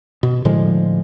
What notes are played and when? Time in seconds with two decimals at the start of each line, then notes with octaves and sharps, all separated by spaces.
0.23 B2
0.45 A2 D3 F3 G#3